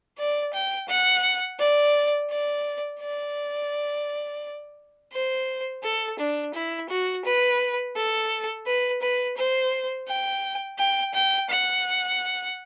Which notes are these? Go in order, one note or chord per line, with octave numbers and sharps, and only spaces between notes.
D5
G5
F#5
D5
D5
D5
C5
A4
D4
E4
F#4
B4
A4
B4
B4
C5
G5
G5
G5
F#5